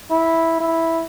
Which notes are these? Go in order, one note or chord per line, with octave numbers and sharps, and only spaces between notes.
E4
E4